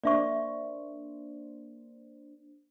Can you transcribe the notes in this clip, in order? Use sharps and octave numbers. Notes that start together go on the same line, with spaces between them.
A#3 D4 C5 D5 E5 C#6